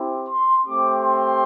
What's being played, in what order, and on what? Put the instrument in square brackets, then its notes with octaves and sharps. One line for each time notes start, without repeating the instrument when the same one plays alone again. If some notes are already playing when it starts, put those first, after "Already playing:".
Already playing: [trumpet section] C4 E4 G4
C6
A3 C4 G4 D6
C6